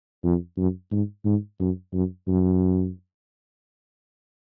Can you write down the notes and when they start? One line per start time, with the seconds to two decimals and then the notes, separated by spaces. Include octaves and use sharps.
0.25 F2
0.58 F#2
0.92 G#2
1.25 G#2
1.60 F#2
1.93 F#2
2.27 F#2